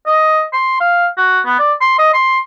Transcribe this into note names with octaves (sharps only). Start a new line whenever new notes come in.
D#5
C6
F5
F#4
B3
D5
C6
D#5
C6